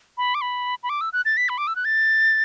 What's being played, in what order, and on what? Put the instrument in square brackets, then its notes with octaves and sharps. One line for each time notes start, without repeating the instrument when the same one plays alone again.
[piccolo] B5
D6
B5
B5
D6
E6
F#6
A6
B6
B5
D6
E6
F#6
A6